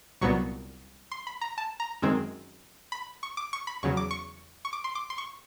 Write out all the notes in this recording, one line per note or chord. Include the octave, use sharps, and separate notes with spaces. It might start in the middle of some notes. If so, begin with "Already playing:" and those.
C2 A#2 F#3 B3 C#6
C6
B5
A#5
A5
A#5
F#2 D#3 G#3 C4
B5
C#6
D6
C#6
B5
E2 C#3 F#3 C#6
D6
C#6
C#6
D6
C6
D6
C6
C#6